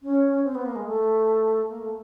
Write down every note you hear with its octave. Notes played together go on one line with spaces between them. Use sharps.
C#4
C4
B3
A#3
G#3
A3
A#3
A3